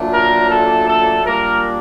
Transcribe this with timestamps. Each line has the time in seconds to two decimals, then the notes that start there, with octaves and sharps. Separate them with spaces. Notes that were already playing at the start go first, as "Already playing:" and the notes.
Already playing: A#2 F#3 A3 D4
0.12 A#4
0.50 A4
0.88 A4
1.26 A#2 G3 A#3 D4 A#4